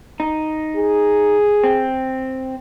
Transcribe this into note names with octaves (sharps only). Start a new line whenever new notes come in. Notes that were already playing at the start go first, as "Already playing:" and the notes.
D#4
G#4
C4